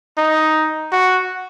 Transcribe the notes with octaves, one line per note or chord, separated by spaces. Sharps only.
D#4
F#4